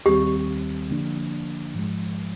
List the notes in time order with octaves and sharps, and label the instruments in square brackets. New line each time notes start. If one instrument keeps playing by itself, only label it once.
[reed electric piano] D#2 D#3 G3 C4 [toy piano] G4
[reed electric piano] D3 F3 A#3 D4
G#2 F3 G#3